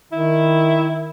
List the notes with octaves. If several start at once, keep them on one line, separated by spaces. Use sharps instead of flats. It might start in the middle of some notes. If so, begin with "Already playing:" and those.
D#3 E4